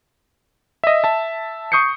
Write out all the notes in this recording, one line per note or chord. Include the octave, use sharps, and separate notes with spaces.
D#5 E5
E5 A5
C#6 D#6 G6 C7 C#7